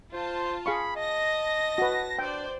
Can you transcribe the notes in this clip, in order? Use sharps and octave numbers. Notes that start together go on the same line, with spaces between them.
F4 C5 A5
G#4 F5 B5 C#6
D#5 A5 A#6
F#4 B4
D4 C5 D5 G5